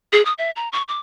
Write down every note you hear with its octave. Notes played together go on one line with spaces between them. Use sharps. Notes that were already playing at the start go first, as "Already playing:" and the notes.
G#4
D#6
E5
A#5
C#6
D6